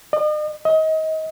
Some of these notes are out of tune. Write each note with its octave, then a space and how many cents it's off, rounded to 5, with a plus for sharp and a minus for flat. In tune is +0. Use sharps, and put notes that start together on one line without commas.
D#5 -40
D#5 +30